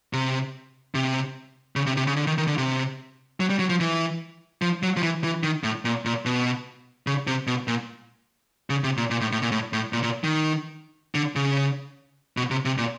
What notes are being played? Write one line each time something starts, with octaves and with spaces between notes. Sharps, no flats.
C3
C3
C#3
C3
C3
C#3
D3
D#3
D#3
D3
C3
F#3
G3
F#3
F3
E3
F3
F#3
F3
E3
E3
D#3
A2
A#2
A#2
B2
C#3
C3
B2
A#2
C#3
C3
A#2
A#2
A2
A2
A#2
A2
A2
A#2
A#2
D#3
D3
C#3
B2
C3
C3
A#2